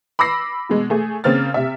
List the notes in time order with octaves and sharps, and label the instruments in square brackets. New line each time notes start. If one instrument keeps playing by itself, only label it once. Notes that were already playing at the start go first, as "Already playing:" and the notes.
[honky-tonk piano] B5 D6 E6 A#6 C7
B2 G#3
A3 G#4
C#3 A#3 C4 F6 A6
C3 E5